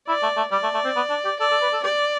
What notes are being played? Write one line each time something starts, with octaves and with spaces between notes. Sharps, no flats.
E4 D5
A3
A3
G3 D5
A3
A3
C4
B3
D4
G4
A4 D5
A4
B4
A4
G4 D5